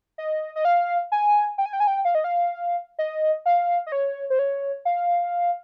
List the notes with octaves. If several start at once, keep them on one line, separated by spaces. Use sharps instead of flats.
D#5
D#5
F5
G#5
G5
G#5
G5
G#5
G5
F5
D#5
F5
D#5
F5
D#5
C#5
C5
C#5
F5